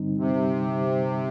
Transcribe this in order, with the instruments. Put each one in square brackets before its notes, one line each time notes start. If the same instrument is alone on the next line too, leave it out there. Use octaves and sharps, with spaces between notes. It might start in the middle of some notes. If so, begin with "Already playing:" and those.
Already playing: [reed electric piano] G2 D3 G3 C4 D#4
[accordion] C3